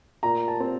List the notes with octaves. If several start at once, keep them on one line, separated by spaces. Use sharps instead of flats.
A#2 A#5
A5
C4